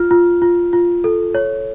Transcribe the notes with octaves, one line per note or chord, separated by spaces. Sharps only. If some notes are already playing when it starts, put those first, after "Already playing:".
Already playing: F4 F6
F4
F4
F4
A4
C#5